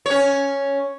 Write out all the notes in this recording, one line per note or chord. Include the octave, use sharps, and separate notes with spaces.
C#4 C#5